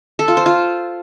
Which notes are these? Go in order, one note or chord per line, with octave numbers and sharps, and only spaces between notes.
A4
F4
C5
F4